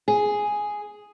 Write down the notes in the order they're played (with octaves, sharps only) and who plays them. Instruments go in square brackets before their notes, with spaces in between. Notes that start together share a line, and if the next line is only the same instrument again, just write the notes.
[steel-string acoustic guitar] G#4